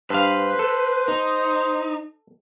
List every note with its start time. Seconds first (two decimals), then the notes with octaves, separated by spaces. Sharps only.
0.10 G2 B4 C5 F5
0.59 A4
1.08 D#4